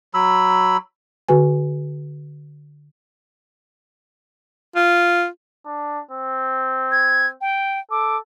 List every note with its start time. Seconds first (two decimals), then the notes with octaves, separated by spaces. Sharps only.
0.14 F#3 B5 E6
1.28 D3 F#4 B4 G#5
4.76 F4
5.66 D4
6.11 C4
6.92 G#6
7.41 G5
7.91 A4 D6